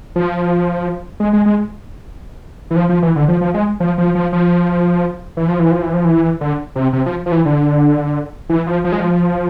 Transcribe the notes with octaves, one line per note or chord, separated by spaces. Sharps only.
F3
G#3
G#3
G#3
E3
F3
F3
E3
D3
F3
F3
G#3
F3
F3
F3
F3
E3
F3
E3
F3
E3
F3
E3
D3
C3
C3
F3
F3
E3
D3
E3
F3
F3
G#3
F3